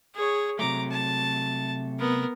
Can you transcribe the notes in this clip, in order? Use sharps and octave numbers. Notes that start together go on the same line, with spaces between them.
G#4 C#5
C3 F#3 A3 A#5 D6
A5
B3 A#4